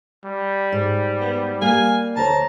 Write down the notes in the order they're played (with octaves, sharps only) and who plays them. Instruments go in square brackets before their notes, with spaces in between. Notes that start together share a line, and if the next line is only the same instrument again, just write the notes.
[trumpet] G3
[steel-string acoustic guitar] G#2
[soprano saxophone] B3
[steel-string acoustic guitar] G3 A#3 [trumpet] F5 [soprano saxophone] G#5
[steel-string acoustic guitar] D2 C5 C#5 [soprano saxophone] A5 [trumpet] A#5